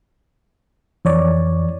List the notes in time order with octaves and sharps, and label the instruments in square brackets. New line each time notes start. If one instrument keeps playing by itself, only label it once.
[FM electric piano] F2 C#5 D5 [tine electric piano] E3